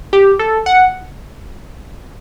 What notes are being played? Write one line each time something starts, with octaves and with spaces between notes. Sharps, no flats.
G4
A4
F#5